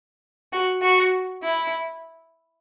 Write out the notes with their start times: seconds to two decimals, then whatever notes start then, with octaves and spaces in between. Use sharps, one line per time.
0.53 F#4
0.82 F#4
1.43 E4